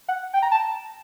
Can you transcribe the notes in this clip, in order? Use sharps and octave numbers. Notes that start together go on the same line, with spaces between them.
F#5
G5
A#5
A5